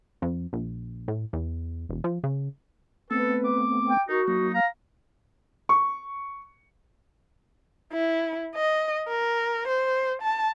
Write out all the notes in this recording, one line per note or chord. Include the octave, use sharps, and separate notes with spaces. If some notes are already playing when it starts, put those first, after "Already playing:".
F2
A#1
A2
E2
E1
F3
C#3
A3 B3 C4 A4 B4
D6
G5
D#4 F#4 A#4
F#3 A#3 D#4
F5 A#5
C#6
E4
D#5
A#4
C5
A5